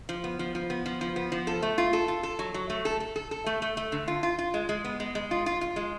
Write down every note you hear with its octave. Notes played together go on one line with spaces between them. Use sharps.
F3
B3
F3
F3
B3
F3
F3
B3
F3
A4
A3
F4
A4
F4
A4
F#3
F#3
A3
A4
A4
A4
A4
A3
A3
A3
D3
F4
F4
F4
G#3
G#3
B3
G#3
G#3
F4
F4
F4
G#3